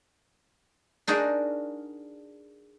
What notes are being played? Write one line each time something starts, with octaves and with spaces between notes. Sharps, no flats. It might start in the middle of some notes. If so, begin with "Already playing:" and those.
D4 D#4 F#4 G#4 A#4